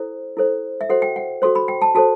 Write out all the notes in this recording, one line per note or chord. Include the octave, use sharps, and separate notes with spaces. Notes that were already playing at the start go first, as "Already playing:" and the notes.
Already playing: E4 A4 C5
E4 A4 C5
E5
F#4 A4 C5 F#5
G5
F#5
F#4 A4 C5 C6
B5
G5
A5
F#4 A4 C5 A5